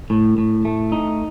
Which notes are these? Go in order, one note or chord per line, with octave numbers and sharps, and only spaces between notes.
A2
A2
A3
D#4